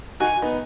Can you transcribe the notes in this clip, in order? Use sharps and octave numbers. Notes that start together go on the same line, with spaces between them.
D#4 F#4 G#5
B3 D#4